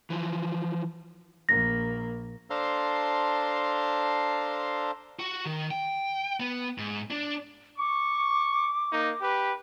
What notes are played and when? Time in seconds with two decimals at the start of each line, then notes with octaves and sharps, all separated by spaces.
0.10 E3 F3
1.49 A#1 A#3 A#6
2.50 D4 A4 C5 F5 A#5 C6
5.19 F#4
5.45 D#3
5.71 G5
6.40 B3
6.78 G#2
7.10 D4
7.78 C#6 D6
8.92 A#3 D#4
9.21 G4 B4